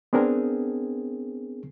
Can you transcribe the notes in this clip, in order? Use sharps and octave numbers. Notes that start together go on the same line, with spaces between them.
B3 C4 D4 G#4 A#4